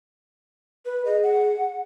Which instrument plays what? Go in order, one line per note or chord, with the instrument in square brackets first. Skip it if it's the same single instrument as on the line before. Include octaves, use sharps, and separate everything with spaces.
[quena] B4
[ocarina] G#4 [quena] D#5
[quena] F#5